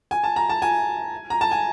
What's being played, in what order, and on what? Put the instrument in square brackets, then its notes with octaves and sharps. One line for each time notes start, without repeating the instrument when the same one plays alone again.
[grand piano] G#5
A5
A#5
A5
G#5
A#5
A5
G#5